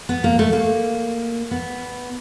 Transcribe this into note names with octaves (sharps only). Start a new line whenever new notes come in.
B3
A#3
A3
A#3
B3